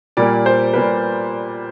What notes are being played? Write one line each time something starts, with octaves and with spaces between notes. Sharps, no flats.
A#2 G3 A#3 D5
C5
A#2 G3 A#3 B4